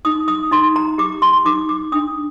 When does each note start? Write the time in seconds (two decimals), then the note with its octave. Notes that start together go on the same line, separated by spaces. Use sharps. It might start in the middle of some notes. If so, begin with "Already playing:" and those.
0.05 D#4 D#6
0.28 D#6
0.52 D#4 C6
0.76 A#5
0.98 G4 D6
1.22 C6
1.45 D#4 D6
1.69 D6
1.92 D4 D#6